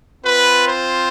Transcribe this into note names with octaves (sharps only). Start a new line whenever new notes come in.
C4 F4 B4
C5